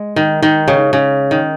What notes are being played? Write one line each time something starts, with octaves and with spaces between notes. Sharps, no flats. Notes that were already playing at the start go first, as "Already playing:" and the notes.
Already playing: G#3
D#3
D#3
C#3
C#3
D#3